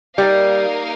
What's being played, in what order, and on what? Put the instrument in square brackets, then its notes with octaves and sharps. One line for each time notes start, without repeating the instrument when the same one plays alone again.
[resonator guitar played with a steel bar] G3 [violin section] A#3 D#4 A#4 F5